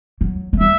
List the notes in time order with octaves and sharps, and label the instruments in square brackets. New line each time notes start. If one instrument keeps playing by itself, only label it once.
[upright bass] F#3
G#3
[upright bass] G3 [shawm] E5